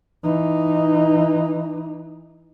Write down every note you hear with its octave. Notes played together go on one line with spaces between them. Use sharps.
E3 D#4